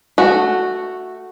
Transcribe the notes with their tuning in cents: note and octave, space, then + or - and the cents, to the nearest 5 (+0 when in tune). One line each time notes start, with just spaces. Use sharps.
A3 +0 F#4 +0